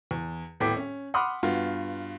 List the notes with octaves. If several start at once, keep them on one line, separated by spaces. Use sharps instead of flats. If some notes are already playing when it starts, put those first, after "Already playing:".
E2
D#1 A2 B3 G5 D6 B6
C#4
F#5 B5 C6 D6 D#6 F6
G2 B3 F4 F#4